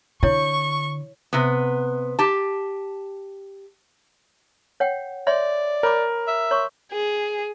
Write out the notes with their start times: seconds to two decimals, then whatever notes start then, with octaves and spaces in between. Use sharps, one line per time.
0.23 D3 E4 C#5 C#6
1.33 C3 B3
2.19 G4 A5
4.80 C#5 F#5 G5
5.27 C#5 D5 E5 C6
5.83 A#4 C#5 B5 D6
6.27 E5
6.51 C#5 C6 C#6
6.92 G#4